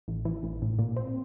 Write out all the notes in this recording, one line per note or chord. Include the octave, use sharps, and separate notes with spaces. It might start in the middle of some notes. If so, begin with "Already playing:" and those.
A1
E3
A1
A2
A#2
C4